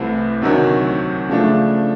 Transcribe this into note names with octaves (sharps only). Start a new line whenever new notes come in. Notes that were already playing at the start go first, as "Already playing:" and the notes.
Already playing: C2 C3 E3 A3 C4
D2 C3 D#3 F#3
C#3 F3 A3 D4